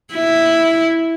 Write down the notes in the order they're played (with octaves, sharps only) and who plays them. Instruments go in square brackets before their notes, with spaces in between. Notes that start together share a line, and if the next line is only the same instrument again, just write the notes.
[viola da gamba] E4